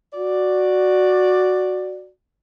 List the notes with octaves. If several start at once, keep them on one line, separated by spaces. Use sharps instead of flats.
F#4 D5